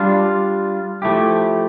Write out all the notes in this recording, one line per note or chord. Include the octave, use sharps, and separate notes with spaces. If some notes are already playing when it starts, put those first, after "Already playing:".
Already playing: G3 D4 F4
F3 A3 E4 G4